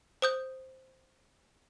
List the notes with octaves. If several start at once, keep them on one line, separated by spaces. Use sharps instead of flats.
C5 D#6 G6